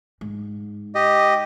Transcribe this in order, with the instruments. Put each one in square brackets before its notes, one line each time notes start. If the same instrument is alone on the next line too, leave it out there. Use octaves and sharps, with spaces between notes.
[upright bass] G#2
[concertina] G4 D#5